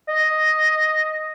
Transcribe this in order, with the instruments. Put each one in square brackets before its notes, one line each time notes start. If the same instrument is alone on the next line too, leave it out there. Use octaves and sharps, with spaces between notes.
[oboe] D#5